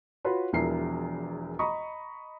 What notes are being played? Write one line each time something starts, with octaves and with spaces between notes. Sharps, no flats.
F4 F#4 B4 C#5 C6
E1 E2 F3 E4 A#4 C7
D#5 A#5 B5 C#6 D#6